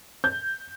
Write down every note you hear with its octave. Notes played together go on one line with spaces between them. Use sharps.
G6